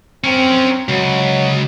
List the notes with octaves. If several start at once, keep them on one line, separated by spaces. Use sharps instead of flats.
C4 C#4 A#4
C#2 F#3